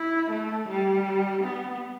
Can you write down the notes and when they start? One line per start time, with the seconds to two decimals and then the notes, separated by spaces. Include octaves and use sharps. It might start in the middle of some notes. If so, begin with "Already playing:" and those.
Already playing: E4
0.30 A3
0.69 G3
1.43 B3